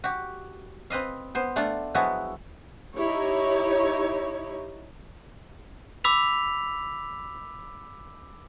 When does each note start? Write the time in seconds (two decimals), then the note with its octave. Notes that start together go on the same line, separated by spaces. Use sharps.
0.04 F#4 G4
0.90 C4 B4 D#5 F5
1.35 B3 C5
1.56 A3 D4 F4 F#5
1.94 F3 F#3 G#3 B3 E4 F#4
2.96 D#4 E4 G4 C#5
6.04 B5 D6 E6 B6 F7